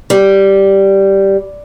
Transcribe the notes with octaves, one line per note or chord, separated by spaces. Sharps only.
G3